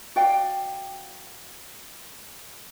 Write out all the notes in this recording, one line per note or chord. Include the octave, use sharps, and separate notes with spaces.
F#4 D5 F5 G5